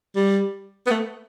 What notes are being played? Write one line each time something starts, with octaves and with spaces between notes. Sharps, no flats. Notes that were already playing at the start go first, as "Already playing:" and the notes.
G3
B3
A3